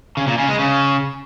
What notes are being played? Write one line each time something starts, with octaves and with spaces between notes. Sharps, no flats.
C#3
A#2
C#3
G#3
C#3